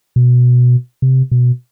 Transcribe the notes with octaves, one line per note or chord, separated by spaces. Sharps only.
B2
C3
B2